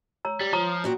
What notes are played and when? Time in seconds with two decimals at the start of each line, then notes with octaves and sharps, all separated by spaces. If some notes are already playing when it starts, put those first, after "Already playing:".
0.25 C#5 A#5 E6
0.41 G3
0.53 F3 C#5 A#5 D#6
0.84 A#2 F#4 G5